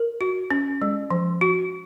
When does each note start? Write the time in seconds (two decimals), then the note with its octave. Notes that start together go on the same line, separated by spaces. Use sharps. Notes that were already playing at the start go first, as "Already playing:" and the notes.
Already playing: A#4
0.21 F#4
0.51 C#4
0.82 G#3
1.11 F3
1.41 F#4